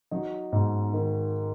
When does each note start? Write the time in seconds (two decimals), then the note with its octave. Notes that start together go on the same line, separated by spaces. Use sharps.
0.11 F#3 D#4
0.52 G#2
0.93 D#3